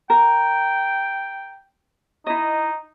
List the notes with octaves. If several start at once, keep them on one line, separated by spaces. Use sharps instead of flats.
A#4 G5
D#4 E4 D#5